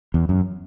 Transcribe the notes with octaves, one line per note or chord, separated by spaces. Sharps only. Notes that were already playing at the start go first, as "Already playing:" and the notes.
E2
F#2